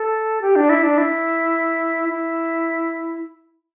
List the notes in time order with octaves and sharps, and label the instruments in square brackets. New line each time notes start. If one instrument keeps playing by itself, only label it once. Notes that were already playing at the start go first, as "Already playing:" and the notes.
Already playing: [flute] A4
G4
D4
E4
D4
E4
E4